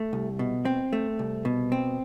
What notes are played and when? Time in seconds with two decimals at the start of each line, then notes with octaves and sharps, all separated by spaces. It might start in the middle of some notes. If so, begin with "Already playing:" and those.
Already playing: A3
0.13 C2
0.39 B2
0.65 C4
0.93 A3
1.19 C2
1.45 B2
1.72 C4